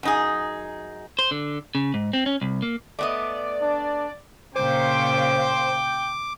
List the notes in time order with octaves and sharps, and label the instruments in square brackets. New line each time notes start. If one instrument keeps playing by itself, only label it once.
[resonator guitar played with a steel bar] F#2 D#4 G#4
[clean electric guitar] C5
D3
C#3
G#2
C4
C#4
C2
A#3
[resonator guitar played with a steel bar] A3 B3 D#5 [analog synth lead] D5
[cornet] D4
[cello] A#2 C#3 [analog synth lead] C5 [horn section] G5 [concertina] D6